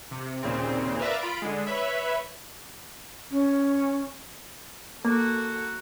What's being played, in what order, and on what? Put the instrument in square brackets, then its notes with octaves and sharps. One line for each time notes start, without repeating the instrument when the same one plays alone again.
[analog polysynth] C3
D#2 A#2 C#3 C4
A#4 B4 D5 E5 F5 A#5
F4 B5 D7
D3 G#3
B4 C#5 E5 B5
[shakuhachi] C#4
[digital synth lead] A#3 [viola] F#4 A4